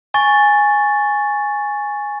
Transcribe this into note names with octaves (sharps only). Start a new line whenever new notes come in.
G#5 C#6 A6